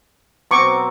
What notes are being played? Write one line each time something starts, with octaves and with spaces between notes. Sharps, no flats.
B2 F#3 C4 A#5 C#6 D6